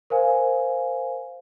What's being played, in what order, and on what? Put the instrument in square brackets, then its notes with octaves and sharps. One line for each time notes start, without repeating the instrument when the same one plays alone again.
[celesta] A#4 C5 F5 G#5